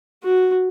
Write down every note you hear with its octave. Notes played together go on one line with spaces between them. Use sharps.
F#4